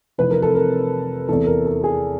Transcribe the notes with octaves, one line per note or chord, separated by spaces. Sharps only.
F1 F2 C3 E3 B4
A#4
A4
A#4
E2 C3 E3 A4
A#4
A4
G#4